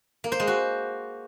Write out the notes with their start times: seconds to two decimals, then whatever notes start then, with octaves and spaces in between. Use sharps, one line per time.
0.24 A#3
0.32 C5
0.40 G#3
0.47 F#4